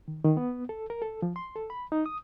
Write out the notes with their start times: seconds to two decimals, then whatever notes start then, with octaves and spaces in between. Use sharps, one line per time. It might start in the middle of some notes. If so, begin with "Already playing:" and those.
0.08 D#3
0.24 D#3
0.37 B3
0.69 A4
0.90 A#4
1.02 A4
1.22 F3
1.36 C6
1.56 A4
1.70 B5
1.92 D#4
2.06 D#6